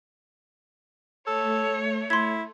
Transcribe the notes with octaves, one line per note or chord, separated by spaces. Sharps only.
A3 A4 C#5
E4 C6 G#6